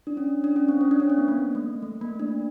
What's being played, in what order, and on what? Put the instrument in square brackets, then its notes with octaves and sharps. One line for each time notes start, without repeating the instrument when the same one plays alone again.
[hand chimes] D4
C#4
D4
C#4
C4
C#4
D4
C#4
C4
B3
A#3
A3
A3
A#3
D4